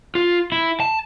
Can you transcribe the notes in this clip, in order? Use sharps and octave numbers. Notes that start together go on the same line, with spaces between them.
F4
E4
A5